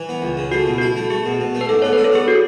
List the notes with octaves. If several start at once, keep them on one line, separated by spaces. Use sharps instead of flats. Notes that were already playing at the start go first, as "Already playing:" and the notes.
Already playing: E3
B3
C#2
C#3
A3 F#4
B2
E4 F#4
A3
A3 G#4
B2
B2
A3
B4
G#2 A4
B3 C#5
D4 B4
A4
B3 G#4
F#4